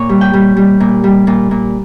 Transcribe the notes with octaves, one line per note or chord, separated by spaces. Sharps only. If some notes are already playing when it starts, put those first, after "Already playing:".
Already playing: A#2 C#5
G3
G5
G3
G3
A#2
G3
A#2
A#2